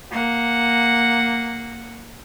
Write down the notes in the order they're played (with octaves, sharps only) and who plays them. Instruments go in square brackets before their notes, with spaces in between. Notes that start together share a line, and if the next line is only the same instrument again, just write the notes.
[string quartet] A#3 F#5